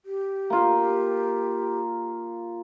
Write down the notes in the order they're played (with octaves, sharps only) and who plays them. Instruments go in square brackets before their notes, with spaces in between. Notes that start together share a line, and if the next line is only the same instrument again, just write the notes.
[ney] G4
[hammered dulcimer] A#3 F4